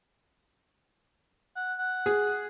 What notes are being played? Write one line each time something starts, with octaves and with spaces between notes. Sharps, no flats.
F#5
F#5
G#4